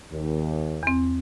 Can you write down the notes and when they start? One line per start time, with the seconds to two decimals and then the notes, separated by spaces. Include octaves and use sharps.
0.11 D#2
0.83 E2 C4